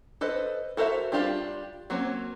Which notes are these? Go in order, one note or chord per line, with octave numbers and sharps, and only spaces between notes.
A4 B4 C5 D#5
F#4 A4 A#4 C5 E5
G3 D4 F4 G4 F5
F#3 A#3 C4 C#4